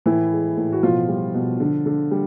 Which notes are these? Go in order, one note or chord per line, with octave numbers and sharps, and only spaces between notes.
A2 E3 E4
G#3
A2
F#4
B2 F3 F4
G3
B2
D3
D3
G3